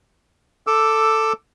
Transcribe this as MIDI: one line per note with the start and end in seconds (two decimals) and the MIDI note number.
0.67 1.33 69
0.67 1.33 86
0.67 1.33 88